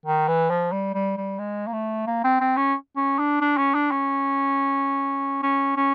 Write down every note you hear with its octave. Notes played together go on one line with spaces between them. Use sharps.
D#3
E3
F3
G3
G3
G3
G#3
A#3
A3
A#3
C4
C4
C#4
C#4
D4
D4
C#4
D4
C#4
C#4
C#4